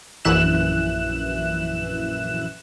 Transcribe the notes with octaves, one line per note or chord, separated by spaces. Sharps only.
A#1 F#2 E3 E5 F#6 E7